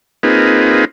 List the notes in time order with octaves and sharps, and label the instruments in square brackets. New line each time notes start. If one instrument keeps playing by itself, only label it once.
[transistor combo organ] A#3 C4 D#4 F4 G#4 B4